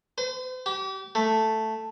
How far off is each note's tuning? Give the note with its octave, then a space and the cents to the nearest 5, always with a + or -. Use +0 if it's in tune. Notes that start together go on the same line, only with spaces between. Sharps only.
C5 -45
G4 -35
A3 +0